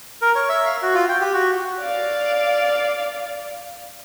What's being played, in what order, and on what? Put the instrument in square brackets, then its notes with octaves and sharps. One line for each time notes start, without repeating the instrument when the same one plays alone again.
[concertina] A#4
C#5
E5
F5
F#4
F4
G5
G4
F#4
[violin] D5 F5